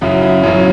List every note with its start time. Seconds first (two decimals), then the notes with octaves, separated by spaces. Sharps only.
0.01 F#2 C#3 F#3 E4
0.22 E4
0.43 F#2 C#3 F#3 C#4